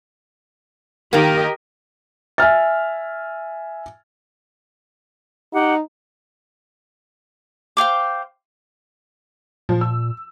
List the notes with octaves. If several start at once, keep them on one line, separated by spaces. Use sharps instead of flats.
D#3 A#3 G4 A#4 D#5
E5 G#5 F6 A6
D#4 G4 F#5
C5 F5 G5 D6
A#2 F3
E6